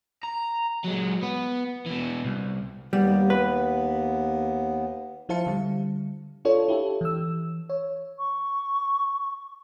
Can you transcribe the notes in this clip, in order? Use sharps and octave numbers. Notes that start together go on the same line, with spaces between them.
A#5
F#3 G#3
B3
B2 E3
C2
D#2 G3 B3
B4
F3 E4 C5 F5 A5 C#7
D3 G3
D4 F4 A4 C#5
E4 G4 A4
E3 E6
C#5
C#6